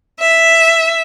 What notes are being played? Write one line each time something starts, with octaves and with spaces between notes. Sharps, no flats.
E5